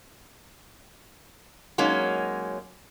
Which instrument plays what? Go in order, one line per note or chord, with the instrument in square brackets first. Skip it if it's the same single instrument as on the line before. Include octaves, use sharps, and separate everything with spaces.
[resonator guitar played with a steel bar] F#3 G#3 A#3 C#4 D#4